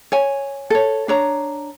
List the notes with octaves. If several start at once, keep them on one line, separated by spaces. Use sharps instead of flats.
C#5 G#5
A4 C#5
D4 C#5 A#5